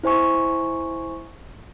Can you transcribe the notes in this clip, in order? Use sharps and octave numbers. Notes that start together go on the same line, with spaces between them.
E4 C5 G#5 C#6